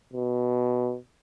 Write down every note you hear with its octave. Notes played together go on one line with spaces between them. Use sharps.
B2